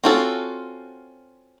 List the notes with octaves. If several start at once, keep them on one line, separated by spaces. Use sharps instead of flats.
C4 C#4 F4 F#4 A4